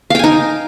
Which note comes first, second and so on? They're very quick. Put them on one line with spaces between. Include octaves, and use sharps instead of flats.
F5 G5 G#5 D#4